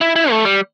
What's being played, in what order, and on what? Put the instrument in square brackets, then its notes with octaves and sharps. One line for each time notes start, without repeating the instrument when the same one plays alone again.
[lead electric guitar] E4
E4
A3
G3